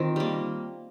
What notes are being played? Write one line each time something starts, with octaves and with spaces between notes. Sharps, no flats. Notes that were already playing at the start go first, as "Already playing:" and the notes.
Already playing: D#3 C4 F4
G3 A#3